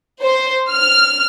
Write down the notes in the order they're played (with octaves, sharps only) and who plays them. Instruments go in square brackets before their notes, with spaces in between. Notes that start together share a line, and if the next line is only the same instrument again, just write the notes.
[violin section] C5
F6